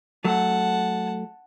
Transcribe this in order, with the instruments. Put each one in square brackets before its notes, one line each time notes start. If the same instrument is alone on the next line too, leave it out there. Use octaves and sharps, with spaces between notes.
[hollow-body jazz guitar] F#3 A3 [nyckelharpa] F#5 A5